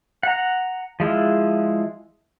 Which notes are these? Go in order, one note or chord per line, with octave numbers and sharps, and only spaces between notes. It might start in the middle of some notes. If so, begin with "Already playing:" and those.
F#5 A#5
F3 G#3 E4 F4